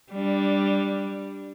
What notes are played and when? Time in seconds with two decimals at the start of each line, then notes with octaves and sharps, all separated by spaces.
0.12 G3 D4